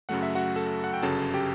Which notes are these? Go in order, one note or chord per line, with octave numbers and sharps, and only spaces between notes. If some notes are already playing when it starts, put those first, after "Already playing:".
F#2 C#3 F#3 A3 F#5
E5
F#4 F#5
A4 A5
F#5
G5
G1 F#2 C#3 F#3 A4 A5
G4 G5